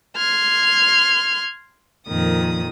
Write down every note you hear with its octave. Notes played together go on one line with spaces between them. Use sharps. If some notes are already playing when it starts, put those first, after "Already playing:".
C6 F6 G#6
F2 A#2 D#3 D#6